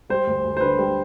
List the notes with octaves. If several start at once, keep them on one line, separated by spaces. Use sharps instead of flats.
G3 C5
D2
D2
C5
D3 B4
G3